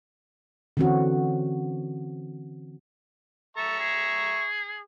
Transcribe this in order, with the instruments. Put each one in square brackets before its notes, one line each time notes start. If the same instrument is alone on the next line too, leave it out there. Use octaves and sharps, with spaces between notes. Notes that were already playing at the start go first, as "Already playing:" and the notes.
[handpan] D3 E3 C4 C#4 F#4
[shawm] A4 [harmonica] E5 A#5 C#6
[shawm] G#4